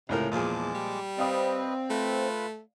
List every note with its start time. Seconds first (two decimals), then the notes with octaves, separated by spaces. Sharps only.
0.09 C#2 A2 C3 A#4
0.31 E2 A#2 F3 G#3 G#4 A5 D6
0.74 G3
1.18 C4 B4 D5 D#5 F5 D#6
1.90 A3 F4 B4